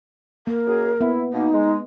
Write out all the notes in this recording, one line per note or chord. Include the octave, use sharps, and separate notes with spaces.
A#3 A#4
F#2 G#4
B3 E4
B2 A#3 D#4
G#3